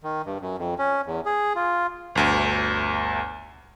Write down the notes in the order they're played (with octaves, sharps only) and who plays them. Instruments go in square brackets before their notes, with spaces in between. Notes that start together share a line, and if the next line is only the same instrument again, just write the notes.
[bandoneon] D#3
G2
F#2
F2
C#4
E2
G#4
F4
[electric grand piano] G1 D2